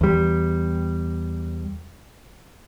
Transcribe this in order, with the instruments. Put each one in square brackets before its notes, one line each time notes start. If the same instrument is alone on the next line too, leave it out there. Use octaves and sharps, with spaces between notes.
[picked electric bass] E2 G3